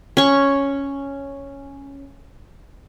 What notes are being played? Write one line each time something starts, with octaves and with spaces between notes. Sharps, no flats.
C#4 C#6